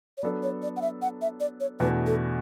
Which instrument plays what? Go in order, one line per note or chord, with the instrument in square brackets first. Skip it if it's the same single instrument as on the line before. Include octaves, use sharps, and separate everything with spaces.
[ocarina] C#5
[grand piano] F#3 B3 D4 A4 [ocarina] D5
[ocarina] C#5
D5
F#5
E5
F#5
E5
D5
C#5
[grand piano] E2 B2 A3 D4 [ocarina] B4
[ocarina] A4